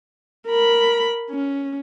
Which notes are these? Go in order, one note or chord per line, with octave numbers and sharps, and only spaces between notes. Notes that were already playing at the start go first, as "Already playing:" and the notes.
A#4 B5
C#4